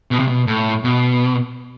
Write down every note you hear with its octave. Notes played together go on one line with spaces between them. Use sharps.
B2
C3
B2
A2
B2